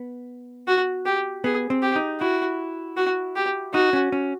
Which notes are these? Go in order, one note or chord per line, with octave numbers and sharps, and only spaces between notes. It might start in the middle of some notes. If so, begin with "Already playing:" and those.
Already playing: B3
F#4
G4
B3 G#4
C4
G4
D#4
E4 F#4
F#4
G4
D#4 F#4
C#4
C#4